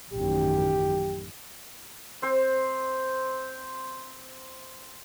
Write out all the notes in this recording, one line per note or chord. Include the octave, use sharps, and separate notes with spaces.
A1 F#2 D#3 G4
C4 C5